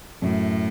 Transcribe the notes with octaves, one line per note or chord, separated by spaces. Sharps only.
F#2 A2